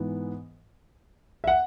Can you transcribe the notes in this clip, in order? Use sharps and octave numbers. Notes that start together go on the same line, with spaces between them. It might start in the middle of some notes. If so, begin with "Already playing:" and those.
Already playing: G#2 E3 B3
E5
F#5